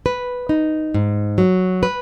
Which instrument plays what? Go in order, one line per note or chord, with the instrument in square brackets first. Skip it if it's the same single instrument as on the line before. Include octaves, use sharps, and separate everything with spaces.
[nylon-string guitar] B4
D#4
G#2
F#3
B4